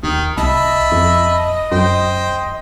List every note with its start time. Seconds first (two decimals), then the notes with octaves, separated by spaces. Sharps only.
0.03 D#2 D#3
0.37 C2 D#5 E5 A5 B5
0.92 F2
1.72 F#2 C5 G5